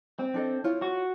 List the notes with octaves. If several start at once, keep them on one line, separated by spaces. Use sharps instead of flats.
C4
D4 A4 D#5
E4 F4 C#5
F#4